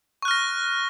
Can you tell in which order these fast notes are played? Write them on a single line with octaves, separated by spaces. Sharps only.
C#6 F#6 F6 A#6